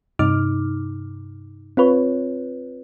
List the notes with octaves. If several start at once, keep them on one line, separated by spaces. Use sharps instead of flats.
G2 C3 D#4 D6 F6
C4 F4 B4 C#5